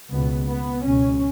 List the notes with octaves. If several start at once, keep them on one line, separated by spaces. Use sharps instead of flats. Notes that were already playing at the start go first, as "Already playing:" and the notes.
C#2 B2 B3
B3
C#2 B2 C#4